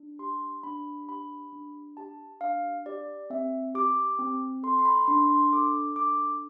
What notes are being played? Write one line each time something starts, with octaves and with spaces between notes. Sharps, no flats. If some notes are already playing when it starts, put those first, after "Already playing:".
Already playing: D4
G4 C6
D4 B5
G4 B5
D4
G4 A5
D4 F5
G4 D5
C4 E5
G4 D6
C4
A4 C6
C6
B5
D4 C6
C6
A4 D6
D4 D6